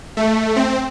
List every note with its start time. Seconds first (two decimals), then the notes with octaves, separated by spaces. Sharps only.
0.17 A3
0.56 C4